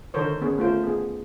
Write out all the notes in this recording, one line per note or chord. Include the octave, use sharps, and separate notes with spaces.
D3 D#3 A4 A#4 C5 C#5
B3 C#4 G#4 C#5
A3 F4 C5
B3 G#4